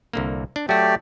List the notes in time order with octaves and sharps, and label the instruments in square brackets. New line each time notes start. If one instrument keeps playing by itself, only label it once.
[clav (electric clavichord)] C2 D3 A#3
D4
[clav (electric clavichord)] F#3 F#4 [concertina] A3 G4 D5